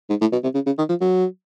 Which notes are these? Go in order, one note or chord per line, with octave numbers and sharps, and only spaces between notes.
G#2
A2
B2
C3
C#3
C#3
D#3
F3
F#3